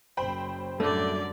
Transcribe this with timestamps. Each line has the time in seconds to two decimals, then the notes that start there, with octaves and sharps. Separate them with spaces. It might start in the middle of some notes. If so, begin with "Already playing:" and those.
0.17 F#1 C5 G5 B5
0.80 F#2 A2 D3 G3 A3 D5